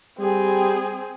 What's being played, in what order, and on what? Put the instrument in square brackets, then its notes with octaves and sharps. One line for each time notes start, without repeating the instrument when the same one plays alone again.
[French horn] G3 [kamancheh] C4 G#4